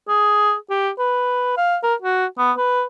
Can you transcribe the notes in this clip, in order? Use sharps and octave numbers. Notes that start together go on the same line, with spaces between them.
G#4
G4
B4
F5
A#4
F#4
B3
B4